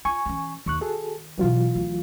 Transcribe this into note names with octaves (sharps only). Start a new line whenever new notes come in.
F4 G#5 C#6
E3 C#4
D#2 D#3 C#6 F#6
F#4 G#4 A4
B2 E3 F#3 D#4 F4
D2